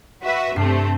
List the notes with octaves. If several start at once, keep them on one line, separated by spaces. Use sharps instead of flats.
F#4 B4 E5
G2 C3 A3 C4 C7